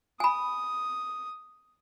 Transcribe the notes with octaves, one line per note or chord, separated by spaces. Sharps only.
G#5 B5 D#6